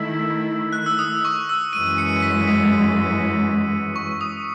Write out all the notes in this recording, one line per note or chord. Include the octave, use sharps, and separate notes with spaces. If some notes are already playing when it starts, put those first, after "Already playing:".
Already playing: D#3 A3 E4 E6
F#6
E6
D#6
C#6
E6
F#2 E3 G#3 D#7
C#7
B6
D#6
C#6
D#6